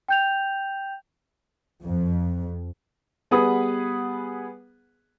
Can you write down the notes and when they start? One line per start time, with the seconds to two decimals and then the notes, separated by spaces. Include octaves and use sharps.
0.08 G5 G6 F7
1.83 F2
3.31 G3 B3 G#4 B4 F#5 D#6